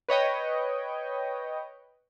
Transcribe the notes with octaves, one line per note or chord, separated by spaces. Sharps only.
B4 C#5 D#5 G5